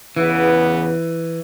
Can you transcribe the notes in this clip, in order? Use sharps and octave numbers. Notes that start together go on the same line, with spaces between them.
E2 C#3 E3 B3